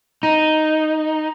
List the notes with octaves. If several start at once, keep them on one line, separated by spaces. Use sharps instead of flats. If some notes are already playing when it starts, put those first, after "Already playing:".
D#4